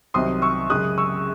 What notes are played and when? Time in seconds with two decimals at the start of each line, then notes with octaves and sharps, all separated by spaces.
0.14 C2 C3 D#3 F#3 C4 C6 D#6
0.42 C#6 E6
0.69 F#2 C#3 G#3 D#6 F#6
0.98 C#6 E6